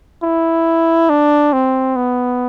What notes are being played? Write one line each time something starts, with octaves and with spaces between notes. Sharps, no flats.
E4
D4
C4
B3